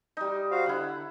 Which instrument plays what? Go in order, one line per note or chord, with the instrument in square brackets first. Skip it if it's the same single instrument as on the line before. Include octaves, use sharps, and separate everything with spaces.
[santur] G3 D#4
[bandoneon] F#4 C5 F5
[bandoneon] D3 [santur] E4 F#5